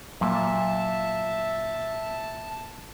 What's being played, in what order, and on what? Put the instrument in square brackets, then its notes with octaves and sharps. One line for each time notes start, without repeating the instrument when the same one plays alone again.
[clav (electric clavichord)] A#2 [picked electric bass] F#3 A#3 [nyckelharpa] E5 [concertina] A5